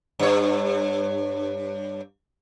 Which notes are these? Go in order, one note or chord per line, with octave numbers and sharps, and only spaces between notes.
G2 C#5